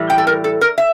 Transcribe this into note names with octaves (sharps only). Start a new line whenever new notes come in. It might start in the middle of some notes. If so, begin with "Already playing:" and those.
Already playing: A2 E3 G3
G5
A4
A#4
A4
A#4
E5